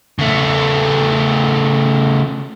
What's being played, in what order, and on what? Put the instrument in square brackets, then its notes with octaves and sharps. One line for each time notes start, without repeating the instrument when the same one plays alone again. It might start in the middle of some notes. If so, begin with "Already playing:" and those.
[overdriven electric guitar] C#3 A3